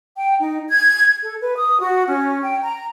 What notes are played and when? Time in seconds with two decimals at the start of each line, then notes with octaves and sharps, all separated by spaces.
0.16 G5
0.40 D#4
0.69 G#6
1.21 A4
1.40 B4
1.56 D#6
1.80 F#4
2.08 C#4
2.42 G5
2.62 A#5